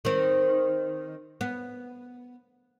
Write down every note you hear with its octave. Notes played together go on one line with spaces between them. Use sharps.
D#3 C4
B3